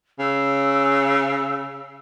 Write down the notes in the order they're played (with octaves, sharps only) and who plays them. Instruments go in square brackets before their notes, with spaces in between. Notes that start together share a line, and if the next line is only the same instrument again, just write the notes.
[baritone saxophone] C#3 [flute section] E6